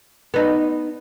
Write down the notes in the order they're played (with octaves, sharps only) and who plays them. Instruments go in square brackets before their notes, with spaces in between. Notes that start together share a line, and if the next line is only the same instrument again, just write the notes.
[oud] B3 D#4